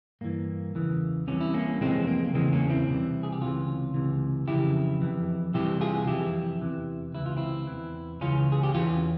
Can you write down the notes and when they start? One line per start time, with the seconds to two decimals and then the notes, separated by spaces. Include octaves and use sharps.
0.21 G2 E3 A#3
0.74 E2 C#3 E3
1.27 C2 C3 E3 C#4
1.41 E4
1.54 A#3 C#4
1.81 F2 C3 E3 G#3 C4
2.07 A#3
2.24 A#3
2.34 E2 C#3 E3 G#3 C4
2.52 A#3 C#4
2.70 C4 E4
2.88 C2 C3 E3
3.23 G#4
3.33 G4
3.41 C#2 C3 E3 C#4 F4
3.94 C#2 C3 E3
4.47 F2 C#3 E3 E4 G4
5.01 F2 E3
5.54 C2 C3 E3 E4 G4
5.81 F4 G#4
6.07 F2 E3 E4 G4
6.61 E2 C3 E3
7.15 C#2 C3 E3 E4
7.26 F4
7.37 C4 E4
7.67 E2 E3
8.21 C#2 C#3 E3 C#4 F4
8.52 G#4
8.63 G4
8.74 E2 E3 C#4 F4